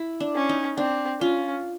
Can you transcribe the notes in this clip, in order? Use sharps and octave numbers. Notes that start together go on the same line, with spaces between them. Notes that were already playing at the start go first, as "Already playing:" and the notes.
Already playing: E4
D4
C#4
D#4
C4 D4
C#4 F4